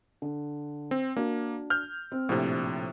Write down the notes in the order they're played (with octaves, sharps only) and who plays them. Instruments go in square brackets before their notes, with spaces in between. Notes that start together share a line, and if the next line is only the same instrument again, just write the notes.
[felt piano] D3
[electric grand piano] C4
[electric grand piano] A#3 [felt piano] D4 F#4
[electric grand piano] F6 G6
[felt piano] C4
[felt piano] A#1 [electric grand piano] A2 C3